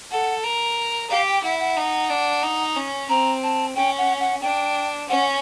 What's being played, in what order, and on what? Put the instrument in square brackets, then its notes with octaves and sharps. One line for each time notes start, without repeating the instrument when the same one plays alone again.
[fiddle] A4 [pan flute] F#5
[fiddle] A#4
[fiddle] G4 [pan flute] F5
[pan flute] G5
[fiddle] E4 [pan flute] F#5
[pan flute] F#5
[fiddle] D#4
D4
D#4
C#4
[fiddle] C4 [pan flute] A#5
[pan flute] A5
[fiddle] C#4 [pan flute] G5
[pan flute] F#5
F#5
[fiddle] D4 [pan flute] G5
[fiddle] C#4 [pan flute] F#5